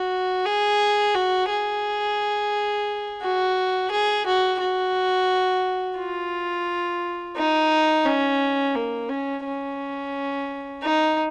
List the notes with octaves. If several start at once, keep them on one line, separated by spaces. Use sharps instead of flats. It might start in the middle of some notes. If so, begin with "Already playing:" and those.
Already playing: F#4
G#4
F#4
G#4
F#4
G#4
F#4
F#4
F4
D#4
C#4
A#3
C#4
C#4
D#4